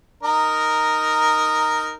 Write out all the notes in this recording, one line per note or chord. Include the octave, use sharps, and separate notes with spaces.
D#4 A#4